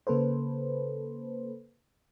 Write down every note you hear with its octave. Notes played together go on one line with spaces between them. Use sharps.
C#3 A#3 A4 B4 C5